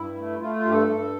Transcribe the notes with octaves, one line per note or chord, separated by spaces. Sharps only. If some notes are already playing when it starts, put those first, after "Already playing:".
Already playing: G2 E4
A3
A3 F4
F4
G2 G4
A4
G2